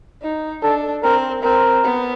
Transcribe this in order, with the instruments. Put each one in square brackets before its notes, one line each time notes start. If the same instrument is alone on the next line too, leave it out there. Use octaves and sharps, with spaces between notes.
[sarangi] D#4
[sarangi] D4 [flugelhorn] A4
[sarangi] C4 [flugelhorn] A#4
[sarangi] C4 [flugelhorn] A#4
[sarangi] B3